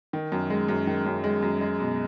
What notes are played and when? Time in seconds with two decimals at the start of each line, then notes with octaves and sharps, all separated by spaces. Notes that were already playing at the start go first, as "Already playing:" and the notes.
0.13 D#3
0.32 F#2
0.50 G#3
0.69 F#2
0.87 D#3
1.06 F#2
1.24 G#3
1.42 F#2
1.61 G#3
1.80 B2